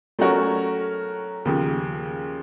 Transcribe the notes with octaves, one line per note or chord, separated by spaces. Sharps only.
F#3 A3 C#4 F#4 A#4
D#2 C#3 F3